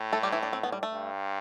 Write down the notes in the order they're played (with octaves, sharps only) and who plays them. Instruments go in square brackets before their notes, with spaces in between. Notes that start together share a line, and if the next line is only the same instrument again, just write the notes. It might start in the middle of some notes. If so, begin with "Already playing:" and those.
Already playing: [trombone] A2
[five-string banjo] A3 A4
G3 G4
E3 E4
D4
C4
B3
G3
A3
[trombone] G2